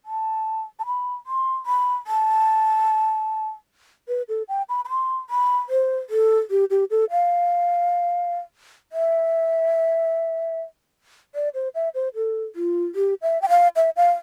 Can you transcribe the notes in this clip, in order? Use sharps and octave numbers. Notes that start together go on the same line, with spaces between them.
A5
A5
B5
C6
B5
A5
B4
A4
G5
B5
B5
C6
B5
C5
A4
G4
G4
A4
F5
E5
D5
C5
E5
C5
A4
F4
G4
E5
G5
F5
E5
F5